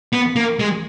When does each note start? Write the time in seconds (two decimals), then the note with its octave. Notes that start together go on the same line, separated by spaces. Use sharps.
0.13 B3
0.36 A#3
0.59 G#3